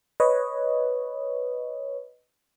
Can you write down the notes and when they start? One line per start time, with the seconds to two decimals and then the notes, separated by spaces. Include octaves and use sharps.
0.20 B4 C#5 D#5